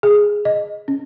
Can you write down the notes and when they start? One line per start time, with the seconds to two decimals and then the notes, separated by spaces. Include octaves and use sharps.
0.03 G#4
0.45 D#5
0.88 C#4